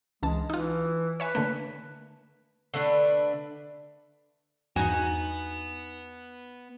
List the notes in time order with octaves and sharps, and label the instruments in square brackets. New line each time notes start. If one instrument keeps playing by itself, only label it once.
[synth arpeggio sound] C#2 E3 A5 [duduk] G#3
[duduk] E3 [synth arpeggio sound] D#4 F4
[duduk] B4 [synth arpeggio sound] C#5 E5 G#5
[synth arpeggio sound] D3 A3 A#3
[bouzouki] D3 A3 D4 B4
[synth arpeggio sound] E2 [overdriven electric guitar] B3 [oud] D#4 F#4 [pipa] G#4